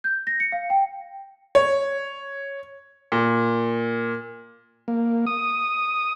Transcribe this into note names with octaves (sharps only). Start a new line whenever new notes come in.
G6
A#6
C#7
F5
G5
C#5
A#2
A#3
D#6